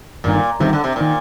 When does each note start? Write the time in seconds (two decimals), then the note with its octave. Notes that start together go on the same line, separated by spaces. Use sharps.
0.24 G1 G2 A#2 D#3
0.60 G1 G2 C3 D#3
0.73 D3
0.84 C3
0.96 A#2 D#3